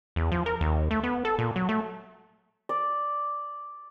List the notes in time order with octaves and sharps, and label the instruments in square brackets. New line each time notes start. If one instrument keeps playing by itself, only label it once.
[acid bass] E2
F3
A#4
D#2
A3
B3
A4
A#2
F#3
A3
[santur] D5